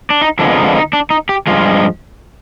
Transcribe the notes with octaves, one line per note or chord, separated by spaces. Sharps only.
D4
D#4
F2 D3 F3 G#3 B3 D4
F4
D#4
D4
D#4
D4
D#4
G4
G2 F3 G#3 F4